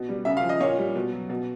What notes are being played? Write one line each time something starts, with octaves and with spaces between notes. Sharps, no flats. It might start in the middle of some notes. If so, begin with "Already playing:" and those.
Already playing: B2
G3
C#3 E5
F5
F3
D#5
A#2 C#5
G3
B2
F#3
B2